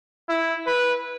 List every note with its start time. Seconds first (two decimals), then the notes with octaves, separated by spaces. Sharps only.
0.29 E4
0.67 B4